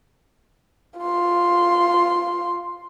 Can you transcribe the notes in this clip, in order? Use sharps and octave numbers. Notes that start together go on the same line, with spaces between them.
F4 C6